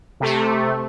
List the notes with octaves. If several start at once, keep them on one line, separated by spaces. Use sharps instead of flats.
C3 A3